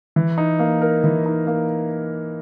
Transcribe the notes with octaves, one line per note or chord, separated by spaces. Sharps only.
E3
D#4
A#3
A#4
E3
D#4
A#3